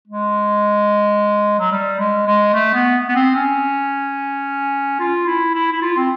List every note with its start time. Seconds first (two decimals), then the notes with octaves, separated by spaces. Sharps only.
0.08 G#3
1.59 F#3
1.72 G3
1.99 G#3
2.27 G#3
2.54 A3
2.74 B3
3.08 B3
3.15 C4
3.36 C#4
5.00 F4
5.27 E4
5.54 E4
5.73 E4
5.82 F4
5.97 C4